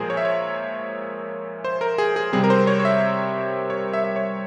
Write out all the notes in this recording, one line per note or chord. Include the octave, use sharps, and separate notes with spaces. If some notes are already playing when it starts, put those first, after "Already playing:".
Already playing: A#2 F3 G#3 G#4 A#4 C5
C#5
E5
C#5
C5
A#4
G#4
G#4
C3 G3 C4 G#4
A#4
C5
C#5
C#5
E5
C#5
E5
E5
C#5